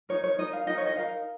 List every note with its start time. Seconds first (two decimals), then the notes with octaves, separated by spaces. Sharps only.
0.09 D#4 A#4 C#5
0.24 C#5
0.38 D#4 A#4 D#5
0.53 F5
0.67 D#4 A#4 D#5
0.78 C#5
0.86 D#5
0.96 D#4 A#4 F5